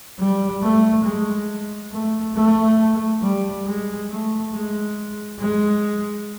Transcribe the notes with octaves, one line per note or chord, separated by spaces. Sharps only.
G3
A3
G#3
A3
A3
G3
G#3
A3
G#3
G#3